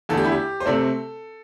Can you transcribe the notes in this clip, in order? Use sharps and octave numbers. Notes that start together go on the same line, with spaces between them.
E2 D3 A3 A4
G4
E4
G4
C5
C3 A3 C4 A4